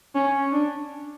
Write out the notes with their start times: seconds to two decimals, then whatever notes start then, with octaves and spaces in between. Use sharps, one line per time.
0.15 C#4
0.52 D4